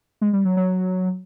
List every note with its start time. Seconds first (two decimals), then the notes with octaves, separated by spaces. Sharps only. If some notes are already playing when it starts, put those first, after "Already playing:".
0.21 G#3
0.33 G3
0.45 F#3
0.57 F#3